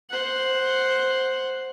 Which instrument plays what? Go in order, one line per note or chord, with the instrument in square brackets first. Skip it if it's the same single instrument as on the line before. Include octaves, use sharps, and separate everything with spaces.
[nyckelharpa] C5 F#5